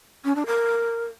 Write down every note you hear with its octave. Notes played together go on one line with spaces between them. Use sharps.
C#4
D4
A#4